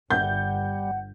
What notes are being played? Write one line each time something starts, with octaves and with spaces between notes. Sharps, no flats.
G1 G3 F#5 G6